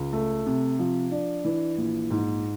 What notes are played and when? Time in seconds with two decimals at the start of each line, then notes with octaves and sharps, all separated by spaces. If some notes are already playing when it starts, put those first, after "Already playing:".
Already playing: C#2
0.13 A3
0.46 C3
0.79 F3
1.11 D4
1.45 E3
1.78 A#1
2.11 G#2